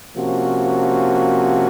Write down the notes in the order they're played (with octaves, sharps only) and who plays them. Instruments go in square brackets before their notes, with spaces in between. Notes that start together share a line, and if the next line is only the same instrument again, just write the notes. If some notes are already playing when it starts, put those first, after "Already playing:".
[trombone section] C3 F3 A#3 C#4 F#4